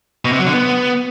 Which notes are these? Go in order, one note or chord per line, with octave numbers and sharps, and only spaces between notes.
B2
C3
F#3
D3
B3